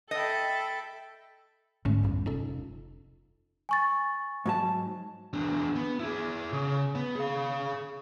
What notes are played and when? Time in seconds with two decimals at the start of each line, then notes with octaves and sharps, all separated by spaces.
0.11 A4 D#5 E5 G5 B5
1.85 G#2 D3 A3 C#4
2.03 B1 E2 G2 G3
2.26 F1 C#4 D#4 A4
3.69 G#5 C#6 A6
4.46 G#2 F#3 A5
5.33 E2 D4
5.76 B3
6.00 E4 G#4
6.53 C#3
6.95 B3
7.15 G#4 F5